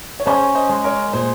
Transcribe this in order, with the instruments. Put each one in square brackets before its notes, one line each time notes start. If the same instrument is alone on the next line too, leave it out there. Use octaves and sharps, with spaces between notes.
[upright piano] C#5
[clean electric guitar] C#4 [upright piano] G#4 C5
[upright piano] C5 D#5
[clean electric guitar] G#3
[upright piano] A#4 C#5
[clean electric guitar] A#2 [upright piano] G#4 C5